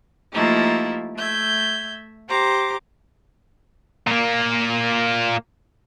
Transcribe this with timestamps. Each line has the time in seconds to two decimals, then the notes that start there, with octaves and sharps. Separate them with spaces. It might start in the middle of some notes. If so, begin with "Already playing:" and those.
0.33 F3 A3 A#3 D#4 E4 G4
1.16 A3 E5 G6 G#6
2.28 G4 C5 A#5 D6
4.07 A#2 A#3